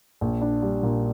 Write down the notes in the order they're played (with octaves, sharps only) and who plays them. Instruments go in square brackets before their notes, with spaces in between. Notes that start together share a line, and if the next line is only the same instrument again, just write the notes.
[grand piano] A#1
D4
G3
A#2